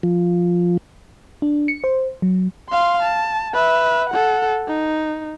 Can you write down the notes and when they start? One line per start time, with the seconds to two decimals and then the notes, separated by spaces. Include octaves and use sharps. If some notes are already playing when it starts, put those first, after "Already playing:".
0.03 F3
1.42 D4
1.68 C#7
1.84 C5
2.22 F#3
2.70 F5 C6
3.03 A5
3.54 B4 E5
4.10 A4 F#5
4.68 D#4